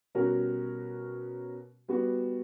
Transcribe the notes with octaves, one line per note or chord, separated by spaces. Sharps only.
B2 G3 C#4 F#4 A#4
G3 B3 F#4